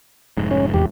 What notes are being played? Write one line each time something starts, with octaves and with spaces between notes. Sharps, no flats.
F1 G#2
C#4
E2 G4